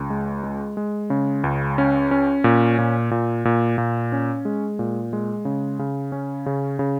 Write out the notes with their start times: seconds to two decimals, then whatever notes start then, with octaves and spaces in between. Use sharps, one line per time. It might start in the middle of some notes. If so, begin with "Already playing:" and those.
Already playing: C#2
0.10 G#3
0.44 G#3
0.77 G#3
1.10 C#3
1.44 C#2
1.78 C#4
2.11 C#4
2.44 A#2
2.79 A#2
3.11 A#2
3.45 A#2
3.78 A#2
4.12 C#4
4.45 G#3
4.79 A#2
5.13 G#3
5.45 C#3
5.79 C#3
6.12 C#4
6.46 C#3
6.79 C#3